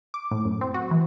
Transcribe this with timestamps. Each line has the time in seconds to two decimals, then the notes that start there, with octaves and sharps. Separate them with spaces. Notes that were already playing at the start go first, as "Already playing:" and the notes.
0.14 D6
0.31 A2
0.45 F#2
0.61 C4
0.74 F#4
0.91 E3